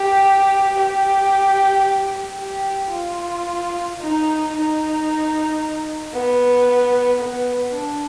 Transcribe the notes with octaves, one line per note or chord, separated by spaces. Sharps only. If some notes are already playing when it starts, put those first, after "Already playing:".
Already playing: G4
G4
G4
F4
D#4
D#4
B3
B3
D4